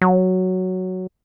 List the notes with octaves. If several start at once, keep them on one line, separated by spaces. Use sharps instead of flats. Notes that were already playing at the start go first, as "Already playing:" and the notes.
F#3